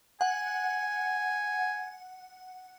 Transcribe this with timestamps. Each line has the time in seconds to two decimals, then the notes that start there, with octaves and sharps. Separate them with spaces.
0.21 F#5 G#5